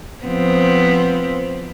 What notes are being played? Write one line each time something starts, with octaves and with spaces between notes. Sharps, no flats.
F3 B3 C4